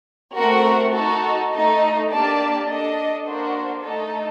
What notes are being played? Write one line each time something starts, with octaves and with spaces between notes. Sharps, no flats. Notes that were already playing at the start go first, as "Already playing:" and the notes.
A3 C4 F#4 A#4 F#5
D#4 F#4 A4
A3 D#4 A4 D#5
A#3 D4 G4 D5 A5
D4 A4 D#5
A#3 D4 F#4 C5
A3 D#4 A4 D#5